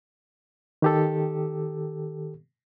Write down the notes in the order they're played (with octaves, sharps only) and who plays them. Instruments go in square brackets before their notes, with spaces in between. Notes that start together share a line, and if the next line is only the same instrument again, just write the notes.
[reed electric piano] D#3 G4 A4